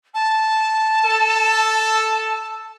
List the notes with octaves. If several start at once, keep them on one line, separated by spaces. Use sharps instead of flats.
A5
A4